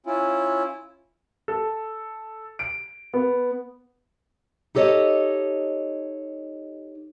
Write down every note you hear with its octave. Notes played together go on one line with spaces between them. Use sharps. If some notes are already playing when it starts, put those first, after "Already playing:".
C#4 E4 F4
A4
D7
B3
D#4 G4 A4 C#5 D#5